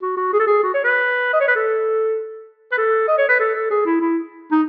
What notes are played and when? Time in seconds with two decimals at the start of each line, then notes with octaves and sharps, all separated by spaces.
0.02 F#4
0.17 F#4
0.33 G#4
0.40 A4
0.47 G#4
0.63 F#4
0.74 C#5
0.84 B4
1.33 D#5
1.40 C#5
1.48 B4
1.56 A4
2.72 B4
2.78 A4
3.08 D#5
3.18 C#5
3.29 B4
3.40 A4
3.55 A4
3.71 G#4
3.86 E4
4.01 E4
4.52 D#4